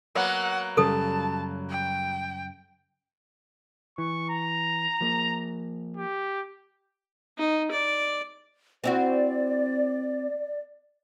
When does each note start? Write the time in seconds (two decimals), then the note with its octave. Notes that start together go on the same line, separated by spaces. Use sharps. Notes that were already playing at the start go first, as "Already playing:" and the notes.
0.15 F#3 A#3 B3 F#5
0.77 F#2 C#3 G3 A4 A5 D#6
1.69 G5
3.98 E3 C#6
4.30 A#5
5.01 F3 A#3
5.96 G4
7.38 D#4
7.71 D5
8.84 C4 E4 F#4 D5